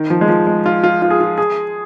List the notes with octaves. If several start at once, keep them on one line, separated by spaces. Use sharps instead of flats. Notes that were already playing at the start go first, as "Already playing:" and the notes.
Already playing: D#3
F3
G#3
F3
G#3
F4
F4
F4
G#4
F4
G#4